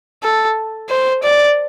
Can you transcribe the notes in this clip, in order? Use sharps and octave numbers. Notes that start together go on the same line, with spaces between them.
A4
C5
D5